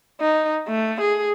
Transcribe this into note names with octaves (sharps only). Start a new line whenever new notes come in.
D#4
A3
G#4